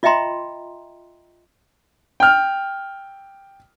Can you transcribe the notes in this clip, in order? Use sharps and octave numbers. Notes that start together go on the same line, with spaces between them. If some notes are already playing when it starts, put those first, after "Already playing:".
F4 D#5 E5 G5 A#5 C6
G5 F6